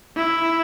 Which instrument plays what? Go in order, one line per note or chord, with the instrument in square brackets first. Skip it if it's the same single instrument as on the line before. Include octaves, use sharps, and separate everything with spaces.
[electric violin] E4